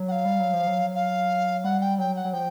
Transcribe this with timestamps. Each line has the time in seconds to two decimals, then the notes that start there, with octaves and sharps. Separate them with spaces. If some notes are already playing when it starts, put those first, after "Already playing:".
Already playing: F#3
0.08 F#5
0.12 F5
0.25 G3
0.40 F#3
0.53 F3
0.67 F#3
0.95 F5
1.64 G3 F#5
1.81 G5
1.98 F#3 G5
2.16 F#5
2.25 F#3
2.33 F3 G5